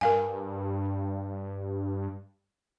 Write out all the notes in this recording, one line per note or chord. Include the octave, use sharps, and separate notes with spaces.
G2 A#4 F5 G#5